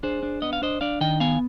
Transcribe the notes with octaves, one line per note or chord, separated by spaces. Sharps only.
D4 G#4 C5
D4
B3 D#5
F5
D4 C5 D#5
D4 D5 F5
D#3 D#5 G5
B3 F5 G#5